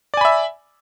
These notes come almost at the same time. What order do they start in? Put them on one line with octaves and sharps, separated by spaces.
D5 G#5 B5 E5